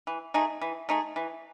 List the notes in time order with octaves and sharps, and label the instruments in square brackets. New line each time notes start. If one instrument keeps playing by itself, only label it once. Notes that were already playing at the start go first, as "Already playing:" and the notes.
[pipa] E3
A3 D#4 G#4
E3
A3 D#4 G#4
E3